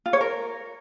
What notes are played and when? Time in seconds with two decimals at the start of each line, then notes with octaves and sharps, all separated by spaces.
0.06 F4
0.13 C#5
0.21 A#4